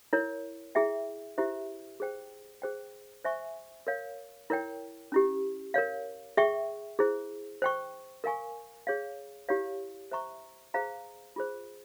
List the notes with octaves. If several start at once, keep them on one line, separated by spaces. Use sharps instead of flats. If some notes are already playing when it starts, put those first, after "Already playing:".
E4 A#4 C#5
E4 G#4 E5 G5
E4 G4 C5 E5
G#4 C5 G5
G#4 C5 G5
C5 E5 G#5 C#6
A#4 C#5 F5
E4 A#4 C#5 G5
C#4 E4 G4
A#4 C#5 F5
G#4 E5 G5 C#6
E4 G#4 C5
C5 G5 C#6
A#4 F5 G#5 C#6
G#4 C#5 F5
E4 G4 C#5 F5
C5 E5 A#5 C#6
G#4 C5 F5 A#5
F4 G#4 C5